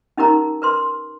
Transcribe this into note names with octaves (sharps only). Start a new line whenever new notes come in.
C#4 D#4 G4 A#4 A#5
A#4 B4 C6